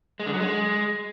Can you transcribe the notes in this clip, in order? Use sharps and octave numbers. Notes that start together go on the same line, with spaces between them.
G#3
D3
F#3
G#3